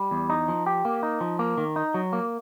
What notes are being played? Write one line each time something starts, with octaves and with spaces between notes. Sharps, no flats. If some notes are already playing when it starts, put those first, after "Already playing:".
Already playing: G3
E2
D#4
F3
G4
A#3
D#4
F3
A#3
D#3
D#4
F#3
A#3